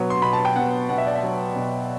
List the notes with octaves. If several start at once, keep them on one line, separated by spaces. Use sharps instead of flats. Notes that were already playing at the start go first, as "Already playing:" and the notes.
Already playing: B2 F#3 B3
C6
B2 B5
A5
G5
F#3 B3 F#5
B2 F#5
E5
D5
E5
F#3 B3
B2